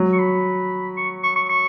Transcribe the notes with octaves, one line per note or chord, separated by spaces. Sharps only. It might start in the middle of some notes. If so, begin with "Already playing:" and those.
Already playing: F#3
C#6
B5
C#6
C#6
C#6
C#6